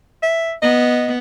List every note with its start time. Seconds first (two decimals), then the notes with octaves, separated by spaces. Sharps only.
0.23 E5
0.62 B3 D#5